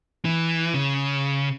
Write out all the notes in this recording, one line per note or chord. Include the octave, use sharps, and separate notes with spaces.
E3
C#3